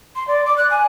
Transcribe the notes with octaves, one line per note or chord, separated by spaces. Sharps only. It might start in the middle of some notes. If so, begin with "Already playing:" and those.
C6
D5
D6
F#6
G#5